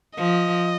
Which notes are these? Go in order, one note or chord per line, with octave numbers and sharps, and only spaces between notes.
F3 D#5